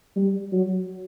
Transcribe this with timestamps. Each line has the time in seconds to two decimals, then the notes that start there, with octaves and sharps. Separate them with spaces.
0.16 G3
0.52 F#3